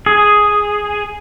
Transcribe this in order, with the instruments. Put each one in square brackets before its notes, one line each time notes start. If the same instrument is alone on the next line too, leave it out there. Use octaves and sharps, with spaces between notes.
[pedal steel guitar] G#4